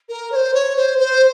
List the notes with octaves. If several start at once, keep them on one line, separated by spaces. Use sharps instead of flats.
A#4
C#5
C5
C#5
C5
C5